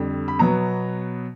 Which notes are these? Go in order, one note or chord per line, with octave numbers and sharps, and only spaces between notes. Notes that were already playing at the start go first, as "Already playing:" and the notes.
Already playing: F2 D3 G3
B5
B2 F#3 B3 A#5